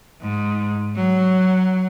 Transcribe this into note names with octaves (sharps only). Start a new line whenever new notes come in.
G#2
F#3